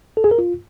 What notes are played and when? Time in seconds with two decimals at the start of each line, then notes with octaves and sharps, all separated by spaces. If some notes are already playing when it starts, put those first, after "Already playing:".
0.17 A4
0.24 G#4
0.31 A#4
0.38 F4